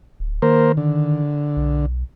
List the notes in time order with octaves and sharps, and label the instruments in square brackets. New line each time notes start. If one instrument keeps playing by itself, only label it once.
[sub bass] D1
[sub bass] D#3 [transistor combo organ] A#3 A#4 C5
[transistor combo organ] D3
[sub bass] B1